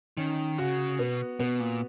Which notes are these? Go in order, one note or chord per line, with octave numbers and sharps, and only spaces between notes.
D#3 C#4
C#3 F#4
B2 B3
B2 B3
A#2